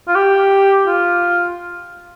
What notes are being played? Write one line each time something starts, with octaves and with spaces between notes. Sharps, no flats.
F4
G4
F4